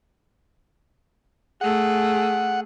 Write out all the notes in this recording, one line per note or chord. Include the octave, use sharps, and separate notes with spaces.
A3 G#4 F#5